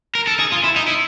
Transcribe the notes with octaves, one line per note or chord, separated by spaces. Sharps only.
A#4
A4
G#4
F4
E4
D#4
E4